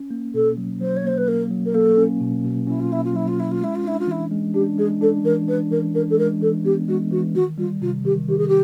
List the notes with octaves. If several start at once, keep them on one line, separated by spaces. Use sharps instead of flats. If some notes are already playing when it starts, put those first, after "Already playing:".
Already playing: C#4
A#3
B2 A4
F#3
F#3 C5
C#5
A#3 C5
B4
A#3 A#4
F#3
A#4
A#3 A4
C#4
B2
B2
C#4 E4
F4
A#3 E4
F4
F#3 E4
F4
C#4 E4
F4
G#3 E4
F4
D4 E4
F4
E3 E4
G#3
D4 G4
G#3 G#4
D4 A4
E3 A#4
D4 B4
E3 A#4
D4 A#4
A4
G#3 A#4
E3 A4
B3 G4
G#3 F#4
E3 F#4
D#3 F#4
G3 F4
C3 F4
D#3 G4
D#3 G4
G#4
G4